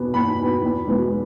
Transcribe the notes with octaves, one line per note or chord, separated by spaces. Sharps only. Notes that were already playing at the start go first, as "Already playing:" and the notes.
Already playing: E2 B2 B3
E2 B5
B2 B3
E2
B2 G#3 B3